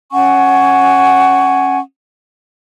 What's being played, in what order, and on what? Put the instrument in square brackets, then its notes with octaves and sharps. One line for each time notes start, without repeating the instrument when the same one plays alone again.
[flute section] C#4 F#5 G#5 C#6